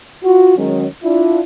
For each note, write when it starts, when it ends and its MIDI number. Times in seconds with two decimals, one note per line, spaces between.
0.24 0.55 65
0.24 0.55 66
0.56 0.85 51
0.56 0.85 54
0.56 0.85 56
0.56 0.85 61
1.04 1.41 62
1.04 1.41 64
1.04 1.41 65